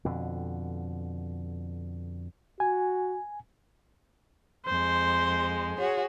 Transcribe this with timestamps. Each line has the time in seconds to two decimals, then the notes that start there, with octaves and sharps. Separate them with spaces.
0.05 F2 B2 D3
2.60 F#4 G#5
4.66 F2 G#3 C5
5.77 F#4 G#4 C#5